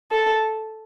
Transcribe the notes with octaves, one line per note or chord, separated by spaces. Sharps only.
A4